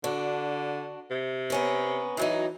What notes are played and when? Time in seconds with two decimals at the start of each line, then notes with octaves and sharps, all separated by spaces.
0.04 D3 D4 F#4
1.11 C3
1.50 B3 C#4 A#4
2.17 D2 E3 F#3 D#4